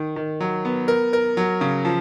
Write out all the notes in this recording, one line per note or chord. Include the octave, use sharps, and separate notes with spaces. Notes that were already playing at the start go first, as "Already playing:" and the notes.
Already playing: D#3
D#3
F#3
B3
A#4
A#4
F#3
C#3
F3